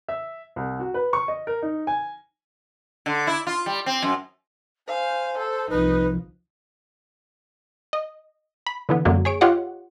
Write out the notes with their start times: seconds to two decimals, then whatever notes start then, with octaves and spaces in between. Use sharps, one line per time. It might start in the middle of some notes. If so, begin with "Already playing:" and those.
0.08 E5
0.56 C2
0.79 F#4
0.94 B4
1.13 C#6
1.28 D#5
1.47 A#4
1.62 D#4
1.87 G#5
3.06 D3
3.27 E4
3.47 F4
3.66 G3
3.86 C4
4.02 F#2
4.87 C5 F5 G#5
5.38 A4
5.70 C2 F3 D#4 B4
7.93 D#5
8.67 B5
8.89 D3 E3 B3
9.05 F#2 D3 F#3 G#3 A#3
9.25 G#4 C#5 D7
9.41 F4 G4 C#5 D#5 F#5